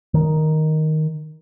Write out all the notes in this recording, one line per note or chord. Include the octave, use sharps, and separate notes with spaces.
D#3